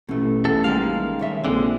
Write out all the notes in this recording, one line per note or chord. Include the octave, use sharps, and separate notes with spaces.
A1 B2 A3
E2 A4
D#3 G3 G#3 A#3 F5
C2 C#5 E5
A#1 D3 G#3 C4